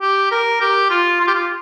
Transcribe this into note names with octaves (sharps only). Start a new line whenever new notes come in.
G4
A#4
G4
F4
F4
G4
F4